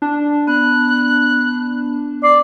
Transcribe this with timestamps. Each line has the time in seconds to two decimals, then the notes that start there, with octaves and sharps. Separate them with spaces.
0.02 D4
0.47 B3 F#6
2.23 D5 C7